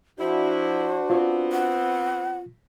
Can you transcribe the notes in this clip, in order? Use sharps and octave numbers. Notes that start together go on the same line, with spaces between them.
F3 D4 E4 F#4 C5
B3 C4 F4
F#5